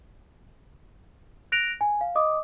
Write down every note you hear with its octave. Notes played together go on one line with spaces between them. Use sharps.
F#6 A#6 D7 F7
G#5
F5
D#5 D6 D#6